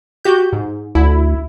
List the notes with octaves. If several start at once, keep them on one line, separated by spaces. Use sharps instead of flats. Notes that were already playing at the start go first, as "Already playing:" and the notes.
F#4 G4 G6
G#2
D2 E4